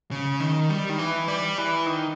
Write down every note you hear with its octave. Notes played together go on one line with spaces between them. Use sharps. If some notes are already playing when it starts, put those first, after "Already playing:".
C#3
D#3
G3
D#3
E3
G3
E3
D#3